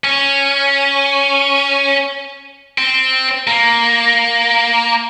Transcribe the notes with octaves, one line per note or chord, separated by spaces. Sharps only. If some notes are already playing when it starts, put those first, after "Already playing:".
C#4
C4
A#3